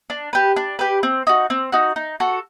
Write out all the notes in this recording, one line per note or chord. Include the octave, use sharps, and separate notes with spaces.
D4
G4 B4
D4
G4 B4
C4
D#4 F#4
C4
D#4 F#4
D#4
F#4 A4